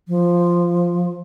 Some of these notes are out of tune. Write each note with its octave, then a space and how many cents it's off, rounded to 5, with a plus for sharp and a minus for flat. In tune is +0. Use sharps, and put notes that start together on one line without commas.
F3 +0